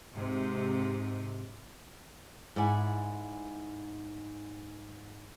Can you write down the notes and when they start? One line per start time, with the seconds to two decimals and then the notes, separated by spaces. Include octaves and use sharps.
0.14 G#2 C3
2.56 G#2 E4 D5 F#5 G#5